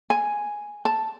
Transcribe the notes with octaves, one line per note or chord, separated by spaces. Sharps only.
G#5
A5